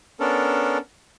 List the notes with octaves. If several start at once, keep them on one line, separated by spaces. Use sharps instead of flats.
B3 C#4 D4 A4 A#4